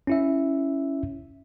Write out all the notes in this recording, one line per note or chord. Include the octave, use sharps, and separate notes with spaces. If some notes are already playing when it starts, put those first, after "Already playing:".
C#4 E4 E5